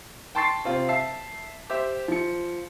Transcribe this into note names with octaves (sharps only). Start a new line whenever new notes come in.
G5 A5 C6 C#6 A6 C7
C3 C4 F4
E5 A5 C7
G4 C5 E5
F3 C#7